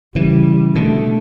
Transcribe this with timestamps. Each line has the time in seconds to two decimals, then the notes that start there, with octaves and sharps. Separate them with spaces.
0.15 C#3 E3 G3
0.75 B2 D3 A3